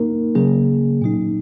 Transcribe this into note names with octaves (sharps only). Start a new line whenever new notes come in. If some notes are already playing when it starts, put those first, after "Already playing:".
Already playing: A#3 D#4 A#4
C#3 F#3 A#3 C#4 G#4
A#2 F#3 D#4